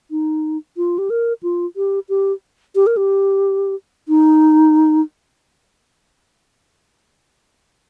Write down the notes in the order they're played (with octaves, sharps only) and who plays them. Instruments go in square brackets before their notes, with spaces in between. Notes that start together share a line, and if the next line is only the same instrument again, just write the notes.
[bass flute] D#4
F4
G4
A#4
F4
G4
G4
G4
A#4
G4
D#4